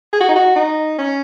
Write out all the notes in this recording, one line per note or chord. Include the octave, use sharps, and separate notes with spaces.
G#4
F#4
D#4
F#4
D#4
C#4